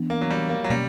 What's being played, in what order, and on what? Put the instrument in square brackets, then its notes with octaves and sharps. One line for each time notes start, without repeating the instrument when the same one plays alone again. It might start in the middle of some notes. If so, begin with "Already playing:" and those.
Already playing: [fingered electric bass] E3 B3 D4
[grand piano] A#3
F#3
G3
A#3
F#3
[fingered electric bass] B2 A#3 C#4 [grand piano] G3